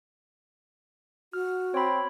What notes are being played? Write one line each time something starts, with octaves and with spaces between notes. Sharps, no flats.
F#4 F6
C4 C#5 B5